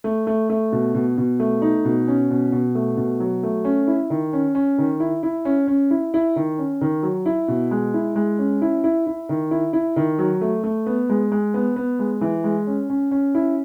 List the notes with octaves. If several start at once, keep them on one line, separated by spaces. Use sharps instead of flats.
A3
A3
A3
B2
B2
B2
A3
D#4
B2
C#4
B2
B2
A3
B2
F#3
A3
C#4
E4
D#3
C#4
C#4
D#3
E4
E4
C#4
C#4
E4
E4
D#3
C#4
D#3
F#3
E4
B2
G#3
E4
G#3
C#4
E4
E4
E4
D#3
E4
E4
D#3
F#3
A3
A3
B3
G#3
G#3
B3
B3
G#3
E3
G#3
C#4
C#4
C#4
E4